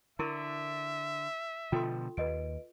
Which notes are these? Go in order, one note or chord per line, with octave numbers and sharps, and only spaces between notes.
D3 E4 A#4 E5 C#6
B2 D3 F3 F4 A4 G5 C6
D#2 B4 D#5 D7